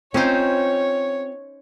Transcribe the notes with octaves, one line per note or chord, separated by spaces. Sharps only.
C4 C#4 D#4 F4 C5 C#5